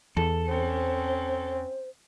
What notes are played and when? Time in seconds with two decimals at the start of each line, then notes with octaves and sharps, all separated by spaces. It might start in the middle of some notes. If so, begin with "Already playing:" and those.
0.17 E2 A4
0.47 C4 C#4 C5